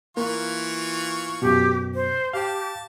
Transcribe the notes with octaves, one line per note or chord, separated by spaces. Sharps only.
E3 A#3 F4 C#6
F#2 B2 G4
C5
G4 F5 G5 A5